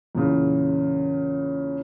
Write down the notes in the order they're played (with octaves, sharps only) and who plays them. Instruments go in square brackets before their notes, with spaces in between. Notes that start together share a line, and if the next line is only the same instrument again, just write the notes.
[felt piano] E2 A#2 C#3